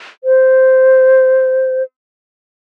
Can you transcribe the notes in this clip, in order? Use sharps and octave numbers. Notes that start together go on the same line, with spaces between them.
C5